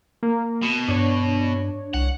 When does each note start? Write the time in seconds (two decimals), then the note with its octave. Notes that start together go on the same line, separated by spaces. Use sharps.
0.23 A#3
0.63 B2
0.88 G2 D4 C#5
1.94 C2 F#5